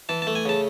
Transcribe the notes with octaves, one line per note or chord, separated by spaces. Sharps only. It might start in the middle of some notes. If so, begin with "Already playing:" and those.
E3 A5
A5
A3
G#5
C#3 A5